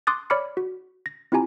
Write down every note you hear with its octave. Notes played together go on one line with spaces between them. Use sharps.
C6 D6 D#6 F#6 A6
C#5 D5 B5 D6 F6 C#7
F#4
A#6
C4 E4 F4 G4 G#5 A#5